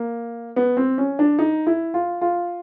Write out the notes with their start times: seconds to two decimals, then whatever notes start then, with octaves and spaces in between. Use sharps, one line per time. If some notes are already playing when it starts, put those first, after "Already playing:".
Already playing: A#3
0.56 B3
0.77 C4
0.98 C#4
1.19 D4
1.39 D#4
1.67 E4
1.94 F4
2.21 F4